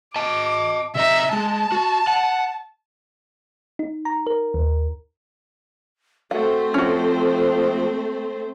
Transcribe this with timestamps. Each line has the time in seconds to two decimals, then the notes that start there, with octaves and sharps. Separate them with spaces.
0.16 D#5 A5 D6
0.95 C3 D#5 E5 A#5
1.33 G#3 A5
1.72 F#4
2.07 F#5
3.79 D#4
4.05 A#5
4.27 A#4
4.54 D#2
6.31 A3 C4 F#4 C5 F#5
6.74 F3 C#4 F#4